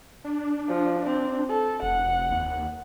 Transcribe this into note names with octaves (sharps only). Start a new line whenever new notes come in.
D4
F3
C4
A4
F1 F#5
D#2